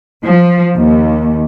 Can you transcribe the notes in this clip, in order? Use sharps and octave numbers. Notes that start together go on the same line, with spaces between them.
F3
D#2